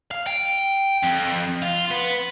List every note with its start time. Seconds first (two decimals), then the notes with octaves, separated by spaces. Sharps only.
0.11 F5
0.27 G5
1.03 F2
1.62 F4
1.91 B3